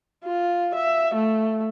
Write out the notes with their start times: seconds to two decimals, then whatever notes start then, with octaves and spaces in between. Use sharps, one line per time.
0.24 F4
0.75 E5
1.15 A3